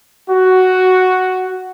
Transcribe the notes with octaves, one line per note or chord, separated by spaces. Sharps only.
F#4